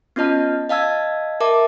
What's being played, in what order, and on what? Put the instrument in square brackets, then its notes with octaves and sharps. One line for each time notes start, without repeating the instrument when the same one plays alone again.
[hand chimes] B3 C#4 F4 D#5 A5 F6
D#5 F5 A5 E6 G#6
A#4 E5 A5 D6